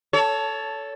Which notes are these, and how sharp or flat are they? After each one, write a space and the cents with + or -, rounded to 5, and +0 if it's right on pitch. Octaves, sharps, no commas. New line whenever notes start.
A4 +0 C#5 +25